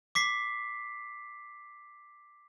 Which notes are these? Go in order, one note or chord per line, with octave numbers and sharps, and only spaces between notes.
D6 B6 C7